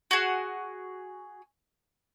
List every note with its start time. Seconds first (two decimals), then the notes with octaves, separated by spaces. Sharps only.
0.11 F#4 G#4